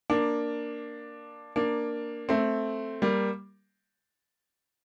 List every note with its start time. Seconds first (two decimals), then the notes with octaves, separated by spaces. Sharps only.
0.10 A#3 D4
1.56 A#3 D4
2.29 A3 C4
3.02 G3 A#3